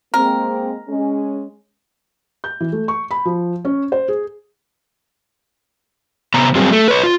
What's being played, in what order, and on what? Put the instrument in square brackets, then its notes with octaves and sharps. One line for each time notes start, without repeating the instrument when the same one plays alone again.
[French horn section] G#3 A#3 C4 [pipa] A#4
[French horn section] G#3 C#4
[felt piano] G6
E3
A3
C#6
B5
F3
C#4
C5
G#4
[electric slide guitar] C3 B3 A#5
F#3 G3 C4 G#4
A3
B4 C#5
F4